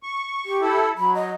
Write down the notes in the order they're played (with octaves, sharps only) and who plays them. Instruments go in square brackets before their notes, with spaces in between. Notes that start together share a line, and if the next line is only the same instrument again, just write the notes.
[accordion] C#6
[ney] G4
[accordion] E4 A4
[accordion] F#3 [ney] B5
[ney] D#5